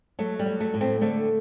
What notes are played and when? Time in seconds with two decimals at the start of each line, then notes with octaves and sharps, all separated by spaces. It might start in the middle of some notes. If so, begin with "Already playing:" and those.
0.19 F#3 A3
0.39 G3
0.46 F#3
0.60 A3
0.74 A2
0.81 A3 C4
1.01 D3 A3